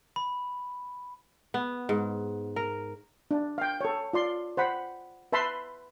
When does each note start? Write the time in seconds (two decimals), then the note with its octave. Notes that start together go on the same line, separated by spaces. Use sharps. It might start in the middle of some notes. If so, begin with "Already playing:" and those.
0.16 B5
1.54 B3
1.89 G#2
2.56 A#4
3.31 D4
3.58 F5 G5
3.81 A4 C#5
4.13 F4 D5 C6
4.57 C5 F#5 B5
5.32 B4 E5 A5 B5 C6